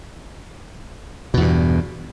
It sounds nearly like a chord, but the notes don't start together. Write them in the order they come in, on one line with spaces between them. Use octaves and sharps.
B2 E2 G2